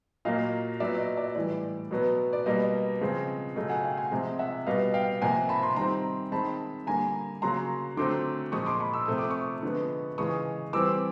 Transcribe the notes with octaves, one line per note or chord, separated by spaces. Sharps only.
A#2 F#3 A#3 D#5 F5
A#2 F#3 B3 D5 E5
D#5
D5 E5
A2 E3 G3 D5
B2 F#3 B3
D5
B2 G3 A#3 D#5
C#3 F3 G#3 C4
C#3 F#3 A3 D#5
F#5 G#5
F5 G5
F#5 G#5
C3 F3 G#3 C4
E5 F#5
B2 G3 B3 D#5 F5
F5 G5
C3 F3 A#3 F#5 G#5
A5 B5
A#5 C6
D#3 G3 C4 A#5 C6
D#3 G#3 C4 A5 B5
D3 G3 A#3 G#5 A#5
C#3 F#3 A#3 A#5 C6
D3 F#3 A3 C4 C6 D6
A#2 F3 G#3 C#6 D#6
C6 D6
B5 C#6
E6
C3 F3 A3 C4 D#6
D6
C#6 D#6
D3 F3 G#3 B3
C#3 E3 G#3 C#6 D#6
E3 G3 C4 D6 E6